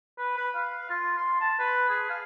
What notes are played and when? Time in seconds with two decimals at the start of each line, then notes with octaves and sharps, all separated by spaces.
0.18 B4
0.37 B4
0.55 F5
0.90 F4
1.18 C6
1.41 A5
1.59 B4
1.89 G#4
2.10 F5